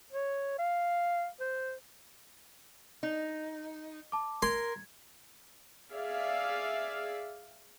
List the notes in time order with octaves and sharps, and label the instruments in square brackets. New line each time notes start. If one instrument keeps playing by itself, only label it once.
[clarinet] C#5
F5
C5
[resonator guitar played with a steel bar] D#4
[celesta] A5 D6
[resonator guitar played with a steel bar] A#4 [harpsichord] C6 [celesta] G#6
[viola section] G#4 D5 E5 F5